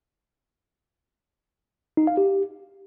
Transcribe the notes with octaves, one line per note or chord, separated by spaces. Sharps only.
D#4
F5
G4